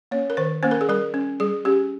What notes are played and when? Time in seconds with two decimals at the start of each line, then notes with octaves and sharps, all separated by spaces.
0.11 A#3 C#4 C#5
0.30 A#4
0.37 D#3 C5
0.63 A#3 C#4 C5
0.71 A#4
0.81 G#4
0.89 G3 A#4
1.14 C#4
1.40 G3 G#4
1.65 C#4 G4